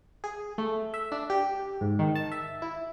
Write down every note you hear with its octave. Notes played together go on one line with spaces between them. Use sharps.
G#4
A3
E5
D4
G4
G#2
D#3
A5
E5
E4